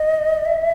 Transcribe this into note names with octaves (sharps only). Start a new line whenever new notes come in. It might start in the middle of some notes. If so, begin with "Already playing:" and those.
Already playing: D#5
E5